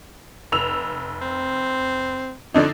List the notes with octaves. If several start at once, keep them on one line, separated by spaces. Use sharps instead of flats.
F1 E6 F7
C4
F2 D3 D4 D#4